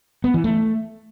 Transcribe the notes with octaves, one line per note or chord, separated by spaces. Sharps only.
B3
E3
A3